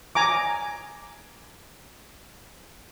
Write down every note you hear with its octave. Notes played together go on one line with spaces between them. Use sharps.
G#5 A#5 D6